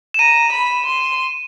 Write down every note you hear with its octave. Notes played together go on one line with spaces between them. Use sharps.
E7
A#5 D#7
B5
C6